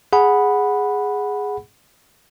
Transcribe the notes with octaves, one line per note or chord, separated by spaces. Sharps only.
G#4 F#5 B5